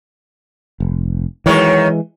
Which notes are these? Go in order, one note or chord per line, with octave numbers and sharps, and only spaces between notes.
F1
F#2 D#3 E3 G#3 C#5